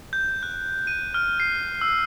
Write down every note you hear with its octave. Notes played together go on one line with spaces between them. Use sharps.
G6
F#6
D#7
F6
C7
E6